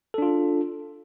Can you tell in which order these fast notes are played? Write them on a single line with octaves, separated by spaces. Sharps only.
A4 D4 F4